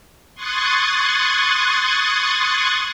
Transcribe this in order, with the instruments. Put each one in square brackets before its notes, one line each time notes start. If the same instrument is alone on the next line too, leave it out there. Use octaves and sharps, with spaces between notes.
[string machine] C6 C#6 D#6 F#6 G#6 A6